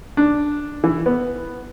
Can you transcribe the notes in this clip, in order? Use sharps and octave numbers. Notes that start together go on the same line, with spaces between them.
D4
E3
B3